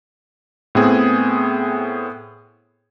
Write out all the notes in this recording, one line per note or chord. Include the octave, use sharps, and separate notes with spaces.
A2 B3 C4 G#4